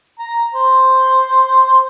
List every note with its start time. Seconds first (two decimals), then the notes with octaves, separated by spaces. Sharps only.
0.19 A#5
0.54 C5